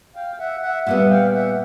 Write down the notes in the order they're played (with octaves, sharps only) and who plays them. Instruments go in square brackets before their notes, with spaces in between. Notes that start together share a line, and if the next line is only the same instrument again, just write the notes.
[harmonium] F5 G5
E5 F#5
E5 F#5
[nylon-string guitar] A#2 G3 B3 [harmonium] E5 F#5
[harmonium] F5 G5
E5 F#5